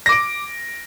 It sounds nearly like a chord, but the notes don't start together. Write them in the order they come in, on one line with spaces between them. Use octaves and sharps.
A#6 D6 D7